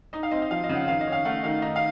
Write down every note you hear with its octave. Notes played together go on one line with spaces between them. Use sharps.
D#4 D#5
F5
C4 D#5
D#5
F3 F5
D#5
C#3
F#5
D#3 F5
D#5
C#4
F5
A3 F#5
D#3 F5
D#4 D#5
F5